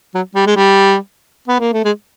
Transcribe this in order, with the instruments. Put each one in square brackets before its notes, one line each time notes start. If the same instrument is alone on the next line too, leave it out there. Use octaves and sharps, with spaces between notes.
[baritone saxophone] F#3
G3
G#3
G3
B3
A#3
A3
G#3